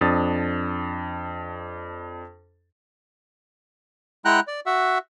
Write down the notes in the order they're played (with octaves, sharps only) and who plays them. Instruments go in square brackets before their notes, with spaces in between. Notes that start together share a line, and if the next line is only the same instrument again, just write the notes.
[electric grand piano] F2 D4 D#6 A6
[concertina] G#3 E4 F#5 G5 A#5 F#6
D5
F#4 E5 F#5